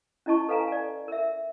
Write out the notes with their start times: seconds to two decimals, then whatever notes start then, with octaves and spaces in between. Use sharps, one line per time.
0.26 C#4 E4 D#5 A5 C#6
0.49 A4 B4 F5 G#5 A#5
0.68 D5 G#5
1.08 A#4 E5